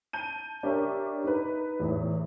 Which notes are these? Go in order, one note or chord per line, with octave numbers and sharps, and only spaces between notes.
A5 G6 D#7
D4 G4 A#4 C#5 E5
D#4 B4
E2 A2